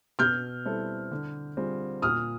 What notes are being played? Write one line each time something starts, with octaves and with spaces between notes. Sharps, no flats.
B2 F6 G6
G3 C4 E4 A4
D3
G3 C4 F4 G#4
A#2 D#6 F6